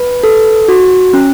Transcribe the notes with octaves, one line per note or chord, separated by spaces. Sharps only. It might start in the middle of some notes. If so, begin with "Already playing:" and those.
Already playing: B4
A4
F#4
C#4